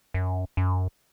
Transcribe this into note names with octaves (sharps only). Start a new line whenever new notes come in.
F#2
F#2